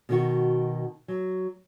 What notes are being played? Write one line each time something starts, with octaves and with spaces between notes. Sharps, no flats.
B2 D#3 F#4
F#3